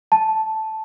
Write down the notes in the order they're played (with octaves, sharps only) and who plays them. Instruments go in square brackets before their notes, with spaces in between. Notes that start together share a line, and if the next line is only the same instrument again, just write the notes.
[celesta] A5